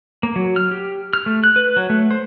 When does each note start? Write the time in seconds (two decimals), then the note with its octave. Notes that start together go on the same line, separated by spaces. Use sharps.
0.23 A#3
0.36 F#3
0.56 F6
0.71 G4
1.13 F6
1.26 A3
1.44 F#6
1.56 B4
1.76 F#3
1.90 A3
2.11 C5